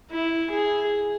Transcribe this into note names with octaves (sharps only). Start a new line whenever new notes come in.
E4
G#4